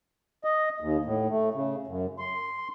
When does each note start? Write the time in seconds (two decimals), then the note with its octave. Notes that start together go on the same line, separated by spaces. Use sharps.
0.44 D#5
0.80 D#2
1.05 A2
1.30 A3
1.54 C#3
1.87 F#2
2.19 C6